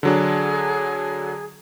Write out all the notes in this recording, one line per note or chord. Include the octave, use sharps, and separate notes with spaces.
D3 F#3 D4 G#4